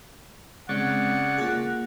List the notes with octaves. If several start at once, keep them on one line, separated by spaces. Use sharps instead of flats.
C#3 G#3 C4 D5 F#5 C#6
A#3 F4 G#4